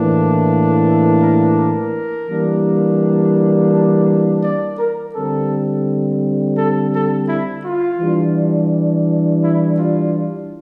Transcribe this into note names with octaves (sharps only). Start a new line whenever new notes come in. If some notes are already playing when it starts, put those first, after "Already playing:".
Already playing: A2 E3 A#3 D4
A4
A#4
A#4
E3 G3 A#3 D4
D5
A#4
D3 G3 C4 A4
A4
A4
E4
F4
E3 G3 D4
E4
F4